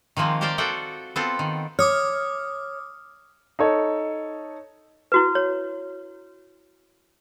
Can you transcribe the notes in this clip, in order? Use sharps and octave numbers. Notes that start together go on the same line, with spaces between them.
D#3 F3 G#3 A#3 C4
G4 A#4 C5 D5 F5 G5
F4 F#4 A4 D5 F#5 G5
B3 C4 F4 A4
D#3
C#5 D6 D#6 F6
D#4 A4 C#5
E4 F#4 B4
C#5